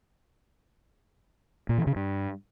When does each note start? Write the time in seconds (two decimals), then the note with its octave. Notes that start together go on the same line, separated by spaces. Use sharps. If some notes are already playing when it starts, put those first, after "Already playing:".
1.69 A#2
1.78 E3
1.87 C#3
1.96 G2